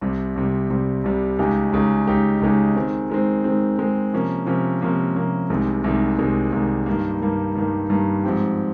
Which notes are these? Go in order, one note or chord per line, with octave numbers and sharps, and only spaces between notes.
C2 C3 G3
C2 C3 G3
C2 C3 G3
C2 C3 G3
C#2 C#3 G#3 D#4 G4
C#2 C#3 G#3 D#4 G4
C#2 C#3 G#3 D#4 G4
C#2 C#3 G#3 D#4 G4
D#3 G#3 C4
D#3 G#3 C4
D#3 G#3 C4
D#3 G#3 C4
C3 F3 A#3 C#4
C3 F3 A#3 C#4
C3 F3 A#3 C#4
C3 F3 A#3 C#4
C2 C3 D#3 G#3
C2 C3 D#3 G#3
C2 C3 D#3 G#3
C2 C3 D#3 G#3
G2 D#3 G3 A#3
G2 D#3 G3 A#3
G2 D#3 G3 A#3
G2 D#3 G3 A#3
G#2 F3 C4 G4